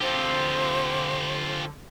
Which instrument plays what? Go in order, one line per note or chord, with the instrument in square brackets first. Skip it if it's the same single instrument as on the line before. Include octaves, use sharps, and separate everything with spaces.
[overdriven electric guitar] D3 C4 [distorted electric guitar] F4 G4 [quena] C5